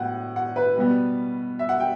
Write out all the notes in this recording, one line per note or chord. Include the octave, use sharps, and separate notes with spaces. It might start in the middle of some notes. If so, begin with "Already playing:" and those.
Already playing: A2 F#3 B3 F#5
F#5
B4
B2 G3 B3
E5
F#5
G5